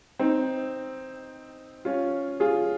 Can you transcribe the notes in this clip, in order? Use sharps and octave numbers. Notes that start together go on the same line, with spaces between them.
C4 D#4
C#4 F4
F4 G#4